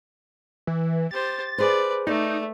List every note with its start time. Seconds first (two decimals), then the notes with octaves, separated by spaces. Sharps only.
0.67 E3
1.11 G4 C5 A6
1.58 G#4 B4 C5 D5
2.07 A3 D#4 D5